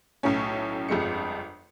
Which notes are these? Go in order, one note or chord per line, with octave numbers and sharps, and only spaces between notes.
B1 A2 C#4
G1 F2 G#3 C#7